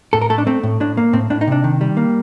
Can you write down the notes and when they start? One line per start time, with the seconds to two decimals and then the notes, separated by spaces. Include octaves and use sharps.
0.13 A2 A4
0.21 A#4
0.30 A3 A4
0.38 D4
0.47 A3 C4
0.63 A2
0.80 A2 D4
0.97 A#3
1.13 A2 C4
1.30 A2 D4
1.41 D#4
1.48 C3 D4
1.64 D#3
1.81 G3
1.97 A#3